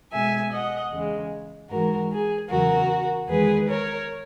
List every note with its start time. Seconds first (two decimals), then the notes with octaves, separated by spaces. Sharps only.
0.11 B2 G#3 E5 G#5
0.51 D#5 F#5
0.91 E2 C#3 G#3
1.69 G#2 E3 G#3 F#4 A#4
2.10 G#4
2.48 E2 C#3 F#3 F#4 A#4
3.28 E2 D#3 G#3 G#4 B4
3.68 A#4 C#5